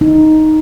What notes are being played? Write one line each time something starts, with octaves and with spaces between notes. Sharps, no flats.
D#4